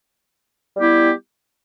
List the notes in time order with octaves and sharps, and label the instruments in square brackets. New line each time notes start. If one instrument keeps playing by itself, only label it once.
[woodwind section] G3 B3 E4 G4